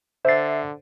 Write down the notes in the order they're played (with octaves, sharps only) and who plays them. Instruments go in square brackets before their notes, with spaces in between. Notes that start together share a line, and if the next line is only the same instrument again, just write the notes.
[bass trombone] D3 [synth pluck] C5 A6 [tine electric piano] E5 C7